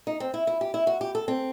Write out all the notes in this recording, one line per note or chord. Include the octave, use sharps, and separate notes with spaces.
D#4
C4
E4
E4
G4
E4
F#4
G4
A4
C4